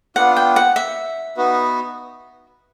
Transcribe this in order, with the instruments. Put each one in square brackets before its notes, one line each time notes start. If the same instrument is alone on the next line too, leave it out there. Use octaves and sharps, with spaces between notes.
[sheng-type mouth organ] B3 D4 F4 [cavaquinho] F#5
[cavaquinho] G5
F#5
E5
[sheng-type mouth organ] B3 D#4 F#4 B4